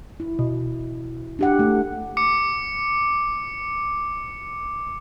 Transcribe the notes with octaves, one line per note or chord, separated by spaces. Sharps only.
E4
B2
D4 G4 F#5
A3
D6 C#7